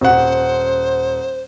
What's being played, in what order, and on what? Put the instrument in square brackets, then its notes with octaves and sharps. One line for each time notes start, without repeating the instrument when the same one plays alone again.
[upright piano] D#1 F#5 [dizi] C5